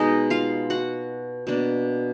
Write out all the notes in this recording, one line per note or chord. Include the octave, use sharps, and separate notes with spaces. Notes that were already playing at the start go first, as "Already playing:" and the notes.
Already playing: B2 G#3 D#4 D#5
F4 F5
F#4 F#5
B2 A#3 D4